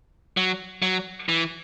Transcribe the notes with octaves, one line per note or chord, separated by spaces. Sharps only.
F#3
F#3
E3